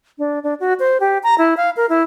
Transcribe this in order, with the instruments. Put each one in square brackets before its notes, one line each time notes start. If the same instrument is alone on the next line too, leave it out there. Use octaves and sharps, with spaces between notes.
[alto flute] D4
D4
F#4
C5
G4
A#5
E4
F5
A#4
E4